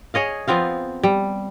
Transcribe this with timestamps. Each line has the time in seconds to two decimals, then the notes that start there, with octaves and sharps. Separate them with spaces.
0.14 G#4 C#5 D#5 F5
0.48 F3 B3 C4 F5
1.03 G3